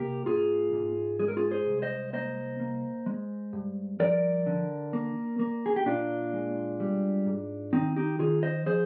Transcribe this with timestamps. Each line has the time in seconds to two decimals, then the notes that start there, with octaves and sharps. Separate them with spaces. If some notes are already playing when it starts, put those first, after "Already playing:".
Already playing: C3 A#3 G4 A#4
0.26 G#2 F4 G#4
0.73 G#2
1.19 G#3 G#4
1.28 A#4
1.37 F4 G#4
1.51 G#4 C5
1.67 C2
1.82 C5 D#5
2.13 A#3 C5 D#5
2.60 A#3
3.06 G#3
3.53 G2
4.00 F3 A#4 D5
4.46 D3
4.93 A#3
5.39 A#3
5.66 G#4
5.76 G4
5.86 A#2 D4 F4
6.33 G#3
6.80 G3
7.26 G#2
7.73 D#3 C4 D#4
7.96 D#4 G4
8.19 D#3 F4 G#4
8.43 C5 D#5
8.66 F3 G#4 C5